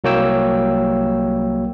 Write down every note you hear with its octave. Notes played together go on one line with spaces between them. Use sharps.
C2 F#3 A#3 C#5 G5 E6